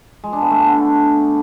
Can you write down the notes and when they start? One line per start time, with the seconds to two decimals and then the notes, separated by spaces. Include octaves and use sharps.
0.24 G#3
0.33 D4
0.42 B3
0.51 A3
0.60 D3